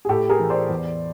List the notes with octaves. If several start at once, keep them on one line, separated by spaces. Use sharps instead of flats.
G#4
A2 G4 A4
G#4 A#4
E3
C5 D5
E2